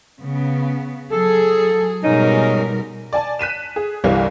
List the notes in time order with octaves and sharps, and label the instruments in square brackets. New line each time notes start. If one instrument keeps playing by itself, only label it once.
[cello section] C#3 B3
[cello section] F#3 G#4 [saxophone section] A4
[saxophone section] G#2 C#4 D#4 [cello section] B2 G3 A#4
[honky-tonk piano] D5 G#5 A5
F#6 B6 D#7 E7
G#4
G1 C2 E3 G3 F5